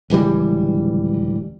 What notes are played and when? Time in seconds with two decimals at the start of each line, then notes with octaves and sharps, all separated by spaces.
0.10 D1 C#2 E3 G3